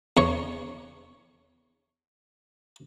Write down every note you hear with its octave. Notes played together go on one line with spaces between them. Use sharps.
E2 C#5